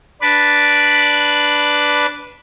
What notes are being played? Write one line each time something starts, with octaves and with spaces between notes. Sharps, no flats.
D4 B4 D5 B5